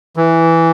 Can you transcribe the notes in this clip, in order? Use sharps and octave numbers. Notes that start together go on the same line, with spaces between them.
E3